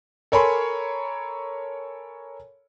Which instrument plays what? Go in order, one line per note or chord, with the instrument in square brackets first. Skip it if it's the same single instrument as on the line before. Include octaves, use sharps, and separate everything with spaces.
[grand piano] A4 A#4 C#5 G#5 B5 C6